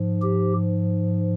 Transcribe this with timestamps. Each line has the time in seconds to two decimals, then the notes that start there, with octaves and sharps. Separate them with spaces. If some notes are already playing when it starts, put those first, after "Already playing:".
Already playing: G#2 F3
0.22 G4